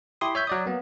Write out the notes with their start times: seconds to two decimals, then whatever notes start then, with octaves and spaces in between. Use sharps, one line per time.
0.21 E4 G4 C6 D#6
0.35 C#5 E5 G6
0.47 F#3 D5 D#6
0.66 A#3 B3